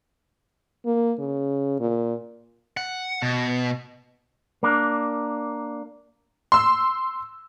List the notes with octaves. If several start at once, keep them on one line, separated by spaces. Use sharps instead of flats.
A#3
C#3
A#2
F#5
B2
A#3 D4
C6 E6